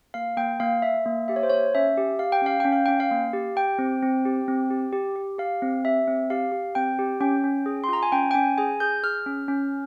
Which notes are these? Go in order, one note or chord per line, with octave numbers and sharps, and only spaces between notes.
A#3 F5
A#3 G5
A#3 F5
A#3 E5
A#3
G4 E5
C#5
C5
A#3 C#5
C#4 E5
G4
G4 F5
G5
C#4 F5
C#4 G5
F5
C#4 G5
F5
A#3
G4
G4 G5
C4
C4
G4
C4
G4
G4
G4
G4 F5
C4
G4 E5
C4
G4 F5
G4
C4 G5
G4
C#4 G5
C#4
G#4
C6
F4 A#5
G#5
C#4 G5
G5
C#4 G#5
G#4 G#5
G#4 G6
G#4 F6
C#4
C#4